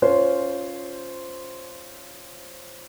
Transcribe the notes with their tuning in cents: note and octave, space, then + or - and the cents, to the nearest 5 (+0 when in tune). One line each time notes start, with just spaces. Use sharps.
C#4 +10 F4 +0 C5 -5